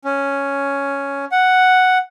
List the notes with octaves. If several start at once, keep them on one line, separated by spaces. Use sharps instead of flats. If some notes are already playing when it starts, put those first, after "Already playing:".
C#4
F#5